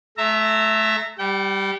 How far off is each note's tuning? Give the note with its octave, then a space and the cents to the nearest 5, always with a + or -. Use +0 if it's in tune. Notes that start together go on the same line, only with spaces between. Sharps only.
A3 -30 E5 +5 A#5 -25
G3 +0 G5 -40